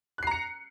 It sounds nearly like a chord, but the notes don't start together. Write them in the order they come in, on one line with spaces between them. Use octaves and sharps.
F#6 C7 A#5 C#7